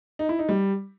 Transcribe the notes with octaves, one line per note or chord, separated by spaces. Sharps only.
D#4
E4
D#4
G3